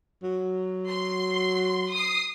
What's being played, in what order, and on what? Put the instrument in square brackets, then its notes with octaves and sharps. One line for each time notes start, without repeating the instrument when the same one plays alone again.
[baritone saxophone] F#3
[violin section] C6
D#6 C7